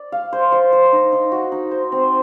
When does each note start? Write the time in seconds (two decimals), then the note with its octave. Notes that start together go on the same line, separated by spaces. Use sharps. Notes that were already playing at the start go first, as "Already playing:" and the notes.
Already playing: D5
0.12 F5
0.33 C5
0.52 C5
0.73 C5
0.93 D#4
1.12 D#4
1.32 F#4
1.52 D#4
1.71 C5
1.92 C4